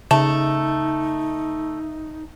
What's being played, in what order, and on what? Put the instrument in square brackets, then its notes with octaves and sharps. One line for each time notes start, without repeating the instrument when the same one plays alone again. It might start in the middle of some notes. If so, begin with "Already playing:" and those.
[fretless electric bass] C#3 [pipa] A3 [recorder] D#4 [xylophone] A5